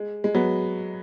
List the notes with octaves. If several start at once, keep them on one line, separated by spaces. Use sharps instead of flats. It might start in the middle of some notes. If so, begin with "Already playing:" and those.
Already playing: G#3
G#3
F#3 B3